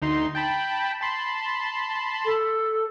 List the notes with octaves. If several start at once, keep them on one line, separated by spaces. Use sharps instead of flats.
D2 D#4 C6
G5 A5 B5
A5 B5 C6
A4